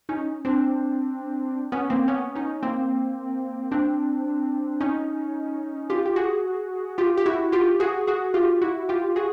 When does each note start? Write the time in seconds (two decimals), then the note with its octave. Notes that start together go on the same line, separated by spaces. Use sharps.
0.09 C#4 D#4
0.45 C4 D4
1.72 B3 C#4
1.90 A#3 C4
2.08 B3 C#4
2.35 C#4 D#4
2.63 A#3 C4
3.71 C4 D4
4.80 C#4 D#4
5.90 F4 G4
6.06 G4
6.16 F#4 G#4
6.98 F4 G4
7.17 G4
7.26 E4 F#4
7.52 F4 G4
7.80 F#4 G#4
8.07 F#4 G#4
8.34 F4 G4
8.62 E4 F#4
8.89 F4 G4
9.16 F#4 G#4